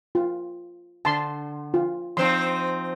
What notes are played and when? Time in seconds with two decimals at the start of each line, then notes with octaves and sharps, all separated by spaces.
0.15 F4
1.05 D3 A5 C6
1.74 F4
2.17 F3 C4 D#4 C6